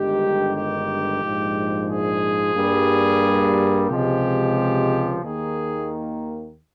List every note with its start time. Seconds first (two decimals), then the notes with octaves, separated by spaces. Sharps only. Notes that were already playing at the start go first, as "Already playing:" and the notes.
Already playing: G1 G2 D#3 G#3 G4
0.55 G4
1.22 A#1 G#2 F3 G#3
1.89 G#4
2.55 G2 G3 A#3
3.89 C#2 C3 F3 G#3 G4
5.22 D#2 D#3 A#3 G#4